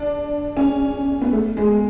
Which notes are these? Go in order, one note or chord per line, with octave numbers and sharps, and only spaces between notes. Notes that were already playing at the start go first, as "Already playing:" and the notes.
Already playing: D4
C#4
B3
A3
G#3